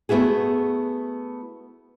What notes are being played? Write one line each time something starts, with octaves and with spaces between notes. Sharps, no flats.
A3 B3 E4 F#4 G#4